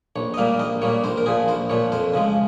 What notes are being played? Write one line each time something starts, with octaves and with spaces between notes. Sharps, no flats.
A#1 C#5
D#5
A#2 G3 A#3 F5
A#1 D#5
A#2 G3 A#3 C#5
A#1 C5
A#4
A#2 F3 G#4
A#1 C5
A#2 F3 C#5
F2 C5
C#3 F3 G#3